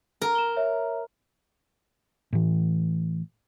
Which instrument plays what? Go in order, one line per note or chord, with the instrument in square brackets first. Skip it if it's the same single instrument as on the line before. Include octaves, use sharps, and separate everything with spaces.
[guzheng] A#4
[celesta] E7 G7
C#5 E5
[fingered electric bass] A2 E3